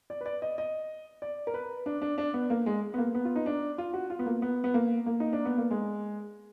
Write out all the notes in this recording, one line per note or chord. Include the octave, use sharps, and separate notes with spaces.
D5
B4
D5
D#5
D#5
D5
A#4
B4
D4
D4
D4
B3
A#3
G#3
B3
A#3
B3
F4
D#4
D4
F4
F#4
F4
B3
A#3
B3
B3
A#3
A#3
D#4
D4
B3
A#3
G#3